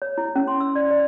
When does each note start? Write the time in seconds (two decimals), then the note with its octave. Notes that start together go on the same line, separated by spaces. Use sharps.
0.02 C#5
0.18 E4
0.36 C#4
0.48 C6
0.60 E6
0.76 D5
0.91 D5